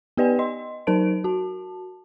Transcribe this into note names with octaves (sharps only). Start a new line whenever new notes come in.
B3 G4 B4 D5 G5 G#5
D#5 C6
F#3 D#4 A#4 C5 A5 D7
F#4 A5